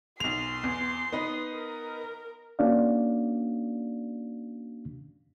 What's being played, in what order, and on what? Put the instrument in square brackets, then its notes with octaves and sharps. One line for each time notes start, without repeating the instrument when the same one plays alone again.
[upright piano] B1 F7 [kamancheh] C6
[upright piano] E2
B3 D#4 B4
[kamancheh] A#4
[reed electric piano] A#3 C#4 D4 F#4 D5 F5